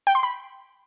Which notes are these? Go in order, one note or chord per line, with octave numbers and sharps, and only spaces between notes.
G5
C6
B5